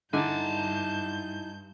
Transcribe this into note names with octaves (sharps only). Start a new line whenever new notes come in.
G2 D3 D#4 E4 G#5 A5 G6